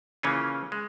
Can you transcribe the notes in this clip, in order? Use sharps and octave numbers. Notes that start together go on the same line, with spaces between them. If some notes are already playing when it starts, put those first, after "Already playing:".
C#3 E3 A#3 C#4 F4
G#3